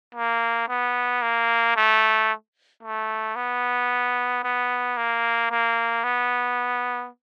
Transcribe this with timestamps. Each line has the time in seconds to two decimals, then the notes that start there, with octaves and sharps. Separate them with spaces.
0.15 A#3
0.68 B3
1.22 A#3
1.76 A3
2.83 A3
3.36 B3
4.44 B3
4.97 A#3
5.51 A#3
6.04 B3